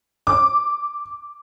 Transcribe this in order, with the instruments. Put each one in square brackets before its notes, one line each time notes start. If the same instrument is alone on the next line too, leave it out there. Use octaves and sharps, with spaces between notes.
[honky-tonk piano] D6